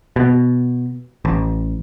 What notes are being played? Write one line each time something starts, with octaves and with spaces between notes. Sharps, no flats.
B2
A1